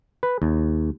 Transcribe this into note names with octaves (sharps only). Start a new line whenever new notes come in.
B4
D#2